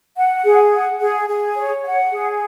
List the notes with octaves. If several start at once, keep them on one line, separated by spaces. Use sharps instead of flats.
F#5
G#4
F#5
G#4
G#4
C#5
F#5
G#4